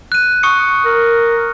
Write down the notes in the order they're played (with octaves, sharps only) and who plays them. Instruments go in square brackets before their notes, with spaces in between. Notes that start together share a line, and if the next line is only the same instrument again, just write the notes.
[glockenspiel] F#6 D#7
C#6 D#6 C#7
[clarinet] A#4